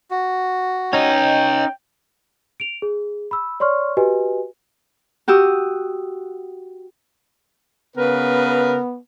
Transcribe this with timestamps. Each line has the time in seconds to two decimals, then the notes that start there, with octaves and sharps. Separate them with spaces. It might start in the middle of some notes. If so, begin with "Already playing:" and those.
0.11 F#4
0.93 C#4 D#4 C#5 D#5 G5
2.60 D7 F7
2.82 G#4
3.31 B5 E6
3.60 C#5 D5 C6 C#6 F6
3.97 F#4 G4 B4 D#5 G#5
5.28 F#4 G4 D#6 E6
7.97 C#3 B3 A#4 B4